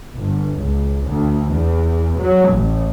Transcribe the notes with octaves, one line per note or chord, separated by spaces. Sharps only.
G1
C#2
D2
E2
F#3
A1